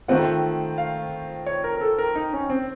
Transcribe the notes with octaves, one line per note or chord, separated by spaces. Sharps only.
D#3 A3 C4 F4 F#5
F5
C#5
A#4
A#4
A4
A#4
D#4
C#4
C4